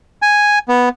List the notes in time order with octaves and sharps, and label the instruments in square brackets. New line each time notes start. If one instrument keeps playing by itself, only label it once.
[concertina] G#5
B3